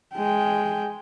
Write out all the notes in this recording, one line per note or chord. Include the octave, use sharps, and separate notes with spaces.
G#3 G5